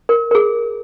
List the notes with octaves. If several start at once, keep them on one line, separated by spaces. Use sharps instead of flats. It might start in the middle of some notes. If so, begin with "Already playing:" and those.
A#4
A#4
G#4